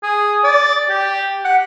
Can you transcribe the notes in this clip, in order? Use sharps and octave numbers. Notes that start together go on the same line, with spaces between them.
G#4
D5
G4
F#5